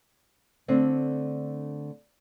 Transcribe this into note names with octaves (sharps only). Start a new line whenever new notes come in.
D3 A3 C4 D4